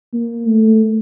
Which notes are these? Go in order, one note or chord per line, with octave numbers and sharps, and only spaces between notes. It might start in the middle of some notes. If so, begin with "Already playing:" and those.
A#3
A3